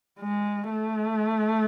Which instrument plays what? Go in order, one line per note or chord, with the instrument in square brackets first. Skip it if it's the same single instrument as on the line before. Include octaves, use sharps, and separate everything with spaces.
[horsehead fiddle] G#3
A3